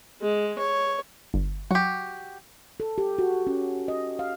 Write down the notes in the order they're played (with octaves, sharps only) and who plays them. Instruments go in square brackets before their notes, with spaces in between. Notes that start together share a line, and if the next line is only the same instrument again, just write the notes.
[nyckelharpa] G#3
C#5
[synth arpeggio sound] G1
[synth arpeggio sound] F#3 [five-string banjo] F#4 G4
[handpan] A4
G4
F#4
C#4
D#5
F5